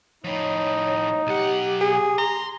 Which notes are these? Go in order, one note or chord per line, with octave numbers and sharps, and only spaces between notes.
A2 F3 D#4 C#5
B1 G4 F#5
G#4
A#5 C6